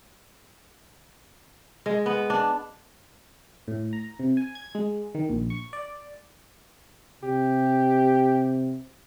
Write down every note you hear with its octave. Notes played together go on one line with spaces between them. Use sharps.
G#3
B3
D4
A2
A#5
C3
G#5
G#6
G#3
D#3
A#1
C#6
D5
C3 G4